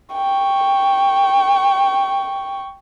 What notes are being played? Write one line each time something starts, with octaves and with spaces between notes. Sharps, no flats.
G5 C#6